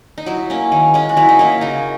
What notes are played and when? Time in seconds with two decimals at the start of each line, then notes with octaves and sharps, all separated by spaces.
0.18 D#4
0.26 F#3 E4
0.50 A#3 C#4
0.72 D#3
0.94 G#3 C#4
1.09 F#4
1.17 F#3 E4
1.29 D#4
1.39 A#3 C#4 E4
1.61 C#3 D#4